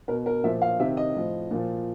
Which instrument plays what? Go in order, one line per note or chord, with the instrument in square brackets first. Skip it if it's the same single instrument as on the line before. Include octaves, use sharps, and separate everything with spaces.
[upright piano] B2 A#4
A#4
A#2 F3 E5
F5
C3 D#3 E5
D#5
A2 F3
A#2 F3